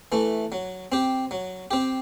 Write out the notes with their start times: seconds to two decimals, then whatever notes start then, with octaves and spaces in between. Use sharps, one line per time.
0.12 E3 A3
0.52 F#3
0.92 C4 G4
1.31 F#3
1.71 C4 G4